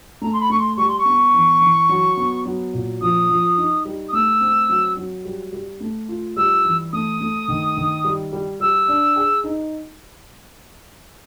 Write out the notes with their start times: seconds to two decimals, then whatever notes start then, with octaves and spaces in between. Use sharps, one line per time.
0.22 A3 A#5
0.33 C6
0.40 B5
0.50 A3 C#6
0.59 C6
0.77 G3 C#6
0.88 C6
0.98 C#6
1.05 B3
1.34 E3
1.61 E3
1.89 F#3
2.17 B3
2.46 F#3
2.73 A#2
3.01 F3 D#6
3.29 F3
3.57 D#4
3.85 G3
4.09 D#6
4.13 A3 E6
4.41 C4
4.69 F#3
4.97 F#3
5.25 G3
5.53 G3
5.80 A3
6.09 F4
6.36 G3 E6
6.64 E3
6.93 A3 D#6
7.20 A3
7.48 D#3
7.77 D#3
8.04 G3
8.33 G3
8.60 G3 E6
8.88 D4
9.16 G#4
9.44 D#4